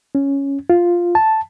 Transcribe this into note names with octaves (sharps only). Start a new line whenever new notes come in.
C#4
F4
A5